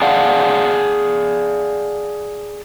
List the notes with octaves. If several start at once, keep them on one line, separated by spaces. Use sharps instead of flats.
G#4 D5 F5 F#5 A5